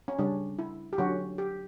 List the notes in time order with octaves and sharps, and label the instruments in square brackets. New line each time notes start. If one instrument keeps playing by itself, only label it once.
[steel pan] C#4
C#3 G3 C#4 D4
E4
G4
D3 F#3 C#4 F#4
G4